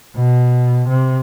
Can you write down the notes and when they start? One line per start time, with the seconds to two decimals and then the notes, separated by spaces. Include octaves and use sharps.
0.16 B2
0.88 C3